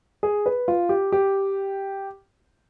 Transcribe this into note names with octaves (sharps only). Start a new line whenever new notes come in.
G#4
B4
F4
G4
G4